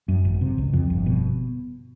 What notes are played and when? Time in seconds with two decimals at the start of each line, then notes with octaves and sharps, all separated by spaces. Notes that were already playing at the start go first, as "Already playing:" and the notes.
0.08 F#2
0.25 G#1
0.41 C3
0.58 C#2
0.73 F2
0.90 G1
1.06 B2